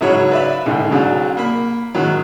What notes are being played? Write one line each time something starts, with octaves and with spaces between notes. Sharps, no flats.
C#2 G#2 F#3 C#5 C#6 F#6
B4 D5 E5 F5 B5
C2 G#2 D3
C2 C#3 F#3 G#4 D5 F5
A#3 B5
G#2 C3 D#3 F#3